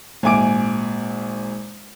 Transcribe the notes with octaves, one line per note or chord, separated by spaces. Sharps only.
G#1 A#2 G#5 D6 D7